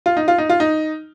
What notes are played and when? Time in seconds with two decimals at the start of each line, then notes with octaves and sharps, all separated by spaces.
0.06 F4
0.17 D#4
0.28 F4
0.38 D#4
0.49 F4
0.60 D#4